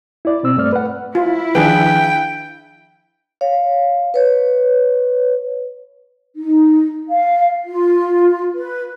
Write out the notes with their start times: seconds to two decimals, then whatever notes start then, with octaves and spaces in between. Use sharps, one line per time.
0.25 E4 D5
0.43 B2 C4 E6
0.57 G2 A3 D5 F6
0.73 B4 F#5
1.15 E4 F4
1.55 D#3 F3 D4 G#4 B4 G5
3.41 C#5 F5
4.14 B4 C#5
6.35 D#4
7.08 F5
7.64 F4
8.55 B4